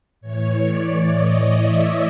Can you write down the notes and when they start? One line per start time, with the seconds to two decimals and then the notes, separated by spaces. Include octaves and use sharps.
0.21 A2 E3 C#5
0.65 D5
1.11 D#5
1.55 E5